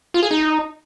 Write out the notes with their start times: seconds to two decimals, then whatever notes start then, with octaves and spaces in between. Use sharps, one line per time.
0.14 F4
0.23 G#4
0.31 D#4